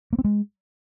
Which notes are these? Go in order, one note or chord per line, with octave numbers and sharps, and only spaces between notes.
A#3
C4
G#3